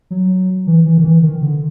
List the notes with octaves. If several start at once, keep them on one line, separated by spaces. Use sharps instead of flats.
F#3
E3
E3
D#3
E3
D#3
D3